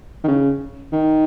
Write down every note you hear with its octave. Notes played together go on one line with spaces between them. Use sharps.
D#3
C#3
D#3